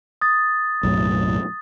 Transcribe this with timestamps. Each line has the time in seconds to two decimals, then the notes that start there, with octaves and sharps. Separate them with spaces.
0.21 D#6 A6
0.83 B1 F#2 A2